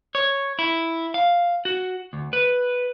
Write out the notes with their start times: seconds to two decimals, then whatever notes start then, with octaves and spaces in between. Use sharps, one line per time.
0.15 C#5
0.59 E4
1.14 F5
1.65 F#4
2.13 D2
2.33 B4